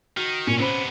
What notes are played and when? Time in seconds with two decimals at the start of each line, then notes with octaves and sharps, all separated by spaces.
0.17 D#3 F#4
0.47 A#2 C#4
0.59 C3 B3 C#4 C5 B5